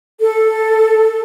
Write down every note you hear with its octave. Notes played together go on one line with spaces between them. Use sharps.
A4